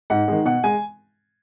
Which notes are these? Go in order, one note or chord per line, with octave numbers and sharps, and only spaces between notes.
G#2 F#5
D#3 G#3
B2 F#5
G#3 G#5